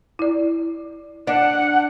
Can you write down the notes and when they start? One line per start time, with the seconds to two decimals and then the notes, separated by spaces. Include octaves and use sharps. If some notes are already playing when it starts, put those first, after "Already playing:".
0.19 E4 D5
1.27 D4 F#5